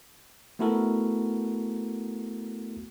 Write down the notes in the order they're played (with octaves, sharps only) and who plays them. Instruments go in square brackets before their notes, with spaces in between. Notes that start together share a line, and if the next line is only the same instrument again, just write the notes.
[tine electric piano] A3 B3 E4 F#4 A4 A#4